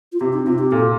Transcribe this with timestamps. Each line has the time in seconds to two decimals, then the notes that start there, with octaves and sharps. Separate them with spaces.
0.13 F4
0.20 C3 G4
0.33 D#4
0.47 C3 F4
0.58 G4
0.72 A#2 A4